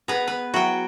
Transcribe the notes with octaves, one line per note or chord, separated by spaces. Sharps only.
B3 G#4 B4 A#5
B4
F#3 E4 F#4 F#5 G5